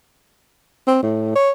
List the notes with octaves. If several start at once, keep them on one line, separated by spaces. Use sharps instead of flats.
C4
A2
C#5